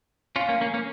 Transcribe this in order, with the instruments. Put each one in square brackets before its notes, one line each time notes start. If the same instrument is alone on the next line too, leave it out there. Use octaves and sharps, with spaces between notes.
[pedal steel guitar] C#4 F4 [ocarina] F5
[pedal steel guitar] A#3 C#4
A#3 C#4
A#3 C#4